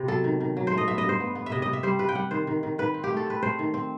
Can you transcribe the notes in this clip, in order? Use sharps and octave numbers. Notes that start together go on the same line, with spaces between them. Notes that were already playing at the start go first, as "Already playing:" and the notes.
Already playing: C3 B3
F#3 A4
D#3
D#3
F#3
C5
A3
D#5
B3 E5
D#5
G2
C5
B3
B3
E5
C3 D#5
C3 D#5
E5
G3 C5
C3 B4
G5
G3 F#5
D#3 C5
D#3
D#3
D#3 B4
C4
G4
A3
A4
C4 B4
A3 C5
D#3
C4